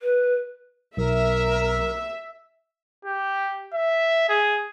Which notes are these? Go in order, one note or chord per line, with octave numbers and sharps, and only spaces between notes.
B4
B1 A#4 E5
G4
E5
G#4